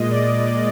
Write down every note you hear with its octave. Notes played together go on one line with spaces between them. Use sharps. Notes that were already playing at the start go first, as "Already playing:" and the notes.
Already playing: A#2 G#3 D#5
D5